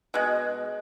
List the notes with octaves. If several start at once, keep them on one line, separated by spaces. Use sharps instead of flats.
B2 G#3